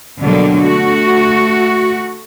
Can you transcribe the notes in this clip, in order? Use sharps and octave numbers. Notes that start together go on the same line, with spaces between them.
B2 D3 F#3 G3 A#3
A3 F#4